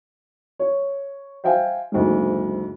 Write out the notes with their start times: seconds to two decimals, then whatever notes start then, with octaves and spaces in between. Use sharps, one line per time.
0.59 C#5
1.44 C5 E5 F5 G5 G#5
1.92 F#1 D2 G#2